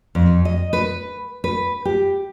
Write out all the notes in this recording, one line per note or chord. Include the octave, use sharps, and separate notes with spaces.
F2
D#5
B4
B4
G4